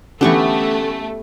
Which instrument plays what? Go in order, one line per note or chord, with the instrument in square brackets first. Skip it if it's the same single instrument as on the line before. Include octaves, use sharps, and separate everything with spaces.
[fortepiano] D3 E3 [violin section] A3 [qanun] B3 G4 C#6 [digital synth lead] C#4